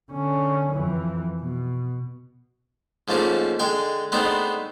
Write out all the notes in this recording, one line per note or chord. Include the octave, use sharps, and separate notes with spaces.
D3 C#4
F2 E3
B2
G#2 F3 A3 A#3 C#4
D3 G#3 G5 G#5
G#3 A3 B3 C4 D4 D#4